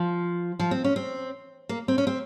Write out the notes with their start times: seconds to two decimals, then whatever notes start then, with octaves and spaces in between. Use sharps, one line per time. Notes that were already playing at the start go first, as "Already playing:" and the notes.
Already playing: F3
0.59 F3
0.71 C4
0.84 C#4
0.96 C4
1.69 A#3
1.88 C4
1.98 C#4
2.07 C4